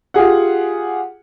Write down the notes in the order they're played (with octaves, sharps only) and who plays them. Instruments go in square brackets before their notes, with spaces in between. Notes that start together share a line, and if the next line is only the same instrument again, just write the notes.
[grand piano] F4 G4 G#4 F#5